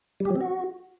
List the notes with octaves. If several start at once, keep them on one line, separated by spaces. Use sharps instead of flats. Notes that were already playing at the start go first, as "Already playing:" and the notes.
G3
G4
F#3
C4
F#4